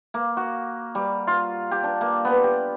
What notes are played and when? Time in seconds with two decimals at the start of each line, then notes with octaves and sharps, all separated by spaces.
0.14 A#3
0.37 F#4
0.95 G3
1.27 F4
1.71 G4
1.84 D4
2.01 A#3
2.25 B3
2.44 G4